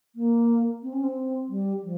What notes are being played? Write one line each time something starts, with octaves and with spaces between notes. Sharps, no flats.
A#3
C4
C#4
C4
G3
F3